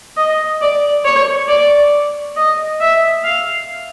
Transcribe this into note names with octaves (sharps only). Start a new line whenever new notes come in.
D#5
D5
C#5
D5
D#5
E5
F5